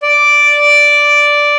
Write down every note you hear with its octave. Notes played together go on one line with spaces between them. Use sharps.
D5